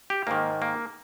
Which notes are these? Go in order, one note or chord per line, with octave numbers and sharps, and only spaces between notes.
G4
G#2 D#3 A#3
A#3